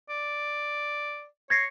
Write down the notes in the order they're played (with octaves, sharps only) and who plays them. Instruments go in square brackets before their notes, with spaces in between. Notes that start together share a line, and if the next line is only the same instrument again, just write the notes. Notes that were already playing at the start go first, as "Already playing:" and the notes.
[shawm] D5
[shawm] C#5 [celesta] G#6 A#6 C7